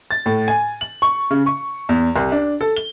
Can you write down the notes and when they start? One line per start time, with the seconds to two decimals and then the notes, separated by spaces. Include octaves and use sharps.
0.11 A6
0.26 A2
0.48 G#5
0.81 F#7
1.02 C#6
1.31 C#3
1.46 C#6
1.89 E2
2.16 C2
2.32 D4
2.61 A4
2.77 G7